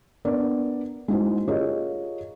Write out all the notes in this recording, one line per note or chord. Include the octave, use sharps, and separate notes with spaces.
B3 D4 A#4 D5
G#3 D#4 E4 F#4 C5
F4 G4 G#4 A#4 C#5 D#5